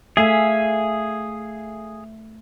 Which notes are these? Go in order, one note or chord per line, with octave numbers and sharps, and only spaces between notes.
A3 G#4 E5 F5 G#5